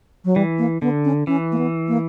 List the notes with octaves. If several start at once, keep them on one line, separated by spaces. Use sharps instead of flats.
F#3
E3 G3
A#3
D3 B3
C#4
E3 C#4
A#3
B3
A#3